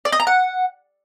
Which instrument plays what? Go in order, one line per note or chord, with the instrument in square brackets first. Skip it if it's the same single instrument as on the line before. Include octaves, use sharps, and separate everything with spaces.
[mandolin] D5
D#5
A#5
F#5